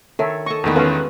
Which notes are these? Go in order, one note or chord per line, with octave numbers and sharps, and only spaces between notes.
D#3 A4 C#5 E5
A4 D#5 C#6
E2 D3 D#3 A3 B3
G#3 C#4 F#4 A4 B4 F5